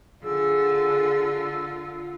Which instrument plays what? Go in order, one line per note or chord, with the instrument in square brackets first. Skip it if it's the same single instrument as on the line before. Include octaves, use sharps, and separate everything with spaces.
[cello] D3 [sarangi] F4 [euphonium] G#4 [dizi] E6